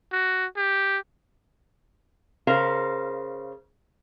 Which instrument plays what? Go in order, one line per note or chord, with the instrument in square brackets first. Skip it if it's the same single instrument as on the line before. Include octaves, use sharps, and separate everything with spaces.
[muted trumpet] F#4
G4
[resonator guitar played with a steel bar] C#3 A#4 C5 F5